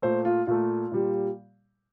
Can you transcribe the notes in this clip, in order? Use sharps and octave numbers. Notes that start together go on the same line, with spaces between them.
A#2 A3 C5
F4
A#2 A3 F4
A#2 G3